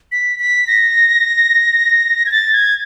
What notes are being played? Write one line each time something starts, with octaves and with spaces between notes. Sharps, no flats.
B6
B6
A#6
G#6
A6
G#6